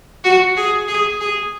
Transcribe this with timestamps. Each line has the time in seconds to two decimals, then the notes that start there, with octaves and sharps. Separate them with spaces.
0.24 F#4
0.56 G#4
0.88 G#4
1.20 G#4